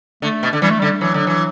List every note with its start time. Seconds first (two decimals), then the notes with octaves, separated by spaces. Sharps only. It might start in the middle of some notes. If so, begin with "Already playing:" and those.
0.22 D3 A3
0.43 B2
0.53 D3
0.62 E3 G3
0.71 A3
0.80 D3 G3
1.01 E3 F#3
1.14 D3
1.27 E3